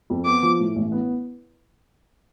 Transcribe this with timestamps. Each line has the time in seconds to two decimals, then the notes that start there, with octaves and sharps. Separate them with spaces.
0.10 F2
0.25 B3 D6
0.43 F3
0.60 A2
0.76 A1
0.92 B3